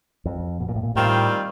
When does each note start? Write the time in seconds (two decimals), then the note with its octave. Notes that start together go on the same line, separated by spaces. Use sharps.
0.25 F2
0.60 B2
0.68 A#2
0.76 A2
0.83 A#2
0.95 A2 D#3 G3 C4 F4